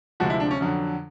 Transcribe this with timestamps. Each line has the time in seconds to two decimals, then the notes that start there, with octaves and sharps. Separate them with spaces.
0.20 D2 C3 F3 G#3 F#4
0.30 E4
0.40 D4
0.51 C#4
0.61 F2 D3 F#3